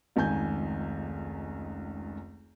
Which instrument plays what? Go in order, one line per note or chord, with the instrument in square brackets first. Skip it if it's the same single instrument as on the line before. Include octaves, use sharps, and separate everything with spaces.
[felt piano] F1 C#2 D#3 G#5 G6